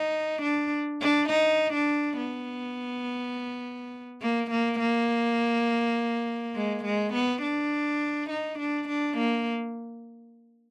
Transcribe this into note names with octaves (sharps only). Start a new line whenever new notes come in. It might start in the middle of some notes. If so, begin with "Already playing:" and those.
Already playing: D#4
D4
D4
D#4
D4
B3
A#3
A#3
A#3
G#3
G#3
B3
D4
D#4
D4
D4
A#3